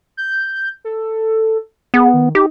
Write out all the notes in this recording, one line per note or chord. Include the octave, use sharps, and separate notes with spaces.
G6
A4
B3 G#4
D#3
D#4 G4